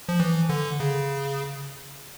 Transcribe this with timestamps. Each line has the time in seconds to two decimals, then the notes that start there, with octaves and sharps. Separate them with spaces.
0.09 F3
0.20 E3
0.49 D3
0.80 C#3